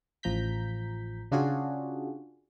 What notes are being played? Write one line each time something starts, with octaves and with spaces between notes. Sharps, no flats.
A1 F3 A#5 G6 B6
C#3 D4 F4 F#4 G#4